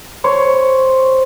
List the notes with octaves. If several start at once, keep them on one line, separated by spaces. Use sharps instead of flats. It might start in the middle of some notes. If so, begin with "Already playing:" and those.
C5 C#5